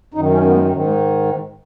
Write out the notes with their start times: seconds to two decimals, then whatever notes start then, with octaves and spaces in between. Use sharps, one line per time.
0.14 F#2 D#4
0.18 D#3
0.33 C#4
0.47 B3
0.53 G#3
0.73 G#2 D#3 F#3
0.87 G#3